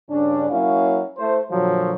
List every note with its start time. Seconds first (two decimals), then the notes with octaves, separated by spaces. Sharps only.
0.10 G2 C#3 C#4 D4
0.50 F#3 A#3 C#4 E4 F5
1.18 A3 E4 C5
1.51 A#2 D3 F3 F#3